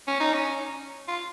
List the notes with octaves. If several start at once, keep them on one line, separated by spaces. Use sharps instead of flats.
C#4
D#4
C#4
F4